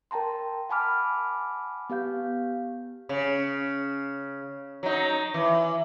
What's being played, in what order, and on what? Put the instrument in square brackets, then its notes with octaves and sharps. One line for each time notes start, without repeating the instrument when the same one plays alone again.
[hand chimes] A#4 G5 A5 A#5 C6
F#5 G#5 A5 B5 D6 F6
B3 G4 F5 G6
[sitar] C#3
F#3 D#4
E3